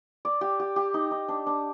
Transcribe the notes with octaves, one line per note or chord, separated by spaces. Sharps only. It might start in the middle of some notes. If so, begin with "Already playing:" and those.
D5
G4
G4
G4
D#4
D#4
D4
D4